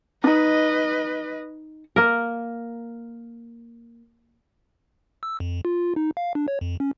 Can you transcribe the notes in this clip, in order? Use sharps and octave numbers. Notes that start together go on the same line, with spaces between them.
D4 D#4 B4 D#5
A#3 A#4
E6
F2
F4
D#4
F5
D4
C#5
F2
C#4